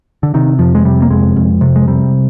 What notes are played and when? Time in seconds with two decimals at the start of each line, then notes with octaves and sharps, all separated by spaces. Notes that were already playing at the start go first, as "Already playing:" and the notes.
0.23 D3
0.34 C3 D#3
0.59 F2 F3
0.75 G#3
0.85 C3 G3
1.02 A#3
1.10 F2 G#3
1.36 F2
1.61 C3
1.76 G#3
1.87 C3 G3